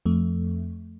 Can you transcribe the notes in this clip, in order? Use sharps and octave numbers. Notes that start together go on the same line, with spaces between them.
F2 A3